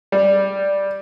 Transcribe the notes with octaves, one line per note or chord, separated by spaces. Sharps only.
G3